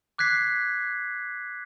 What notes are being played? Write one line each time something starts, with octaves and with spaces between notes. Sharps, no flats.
D6 F#6 G#6 B6 C7